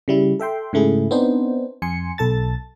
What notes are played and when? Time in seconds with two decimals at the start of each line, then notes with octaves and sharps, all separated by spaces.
0.08 C#3 G3 E4
0.40 A4 E5 G5 C6
0.73 G#2 C#3 A3 E4 G#4
1.11 B3 C4 D4 D#4 C5
1.82 F2 G#5 C6 C#7
2.18 B1 A4 A5 A6